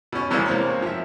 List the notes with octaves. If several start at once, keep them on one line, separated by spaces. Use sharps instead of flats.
B2 C#4
E2 C3 E3 G3 G#3 A#3
A#3 C4 C#5
F3 E5